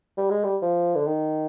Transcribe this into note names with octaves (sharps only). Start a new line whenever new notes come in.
G3
G#3
G3
F3
D3
D#3